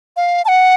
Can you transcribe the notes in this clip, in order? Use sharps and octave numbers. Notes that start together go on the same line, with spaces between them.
F5
A5
F#5